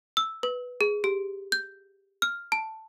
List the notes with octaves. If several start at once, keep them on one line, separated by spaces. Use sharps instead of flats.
E6
B4
G#4
G4
G6
F6
A5